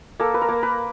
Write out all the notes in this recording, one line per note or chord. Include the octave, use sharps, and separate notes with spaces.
A#3 A4
B4
A#4
A#3
B4